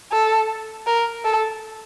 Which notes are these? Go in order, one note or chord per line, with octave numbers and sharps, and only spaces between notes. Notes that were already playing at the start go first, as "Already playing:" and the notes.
A4
A#4
A4